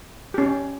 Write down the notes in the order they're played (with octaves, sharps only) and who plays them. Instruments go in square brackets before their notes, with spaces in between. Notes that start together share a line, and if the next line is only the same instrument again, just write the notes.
[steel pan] C#4 G4